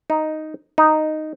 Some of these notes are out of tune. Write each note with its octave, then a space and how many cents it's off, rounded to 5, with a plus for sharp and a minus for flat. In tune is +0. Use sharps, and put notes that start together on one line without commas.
D#4 +0
D#4 -5